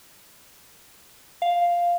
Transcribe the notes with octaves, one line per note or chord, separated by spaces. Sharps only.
F5